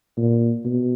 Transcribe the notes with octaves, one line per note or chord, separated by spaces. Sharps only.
A#2
B2